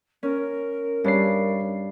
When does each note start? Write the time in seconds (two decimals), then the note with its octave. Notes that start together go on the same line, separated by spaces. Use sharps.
0.23 C#4 A#4
1.04 G2 C#4 C#5 C7